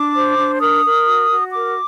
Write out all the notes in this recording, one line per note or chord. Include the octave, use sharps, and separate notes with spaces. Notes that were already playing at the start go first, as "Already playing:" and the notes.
Already playing: D4 D6
C5
D4
A#4 D#6
A#4
F#4
F#4
A#4 D6